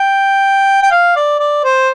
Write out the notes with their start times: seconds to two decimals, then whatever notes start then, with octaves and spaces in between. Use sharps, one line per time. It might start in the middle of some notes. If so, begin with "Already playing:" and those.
Already playing: G5
0.83 G5
0.92 F5
1.16 D5
1.39 D5
1.64 C5